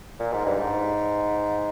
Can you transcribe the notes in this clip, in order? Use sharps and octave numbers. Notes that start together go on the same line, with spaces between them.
A#2
G#2
G2
G#2